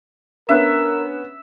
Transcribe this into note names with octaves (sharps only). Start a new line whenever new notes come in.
B3 C#4 D4 A#4 E5 F#6